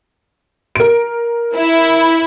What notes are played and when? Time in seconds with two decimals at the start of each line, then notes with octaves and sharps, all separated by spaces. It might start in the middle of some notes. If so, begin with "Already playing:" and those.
0.76 A#4 D7
1.56 E4